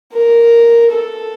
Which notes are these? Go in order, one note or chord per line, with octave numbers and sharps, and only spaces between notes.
A#4
A4